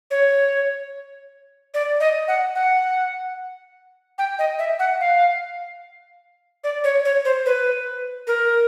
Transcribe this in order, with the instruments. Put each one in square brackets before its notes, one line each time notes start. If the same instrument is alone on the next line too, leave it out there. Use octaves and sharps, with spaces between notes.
[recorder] C#5
D5
D#5
F#5
F#5
G5
D#5
E5
F#5
F5
D5
C#5
C#5
C5
B4
A#4